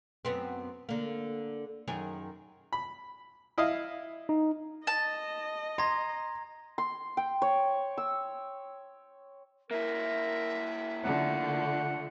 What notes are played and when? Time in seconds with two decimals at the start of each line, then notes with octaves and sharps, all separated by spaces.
0.25 F#2 B3 C4
0.89 D3 A#3
1.87 F#2 D#3 G#4
2.73 B5
3.58 E4 D#5 F5
4.29 D#4
4.87 D#5 A5
5.78 A#5 C6 G#6 A#6
6.78 C6
7.17 G5
7.42 C#5
7.98 E6
9.71 A#3 E4 A#4 E5
11.04 D3 F3 A3 F#5